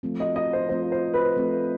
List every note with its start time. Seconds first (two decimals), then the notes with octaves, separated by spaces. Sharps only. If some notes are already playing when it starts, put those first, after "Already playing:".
0.03 F3 A3 C4 F4
0.20 D#5
0.36 D#5
0.53 C5
0.69 F3 A3 C4 F4 C5
0.92 C5
1.14 B4
1.36 F3 A3 C4 F4